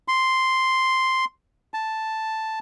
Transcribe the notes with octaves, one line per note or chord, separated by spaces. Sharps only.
C6
A5